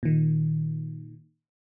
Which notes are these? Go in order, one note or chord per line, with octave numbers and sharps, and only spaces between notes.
A#2 D#3